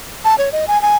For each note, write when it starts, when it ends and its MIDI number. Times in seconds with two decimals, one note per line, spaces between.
0.25 0.35 81
0.38 0.49 73
0.52 0.65 75
0.68 0.81 80
0.82 0.97 80